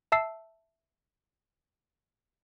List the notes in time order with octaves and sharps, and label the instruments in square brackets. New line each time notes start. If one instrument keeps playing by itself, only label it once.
[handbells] E5 A5 E6 C7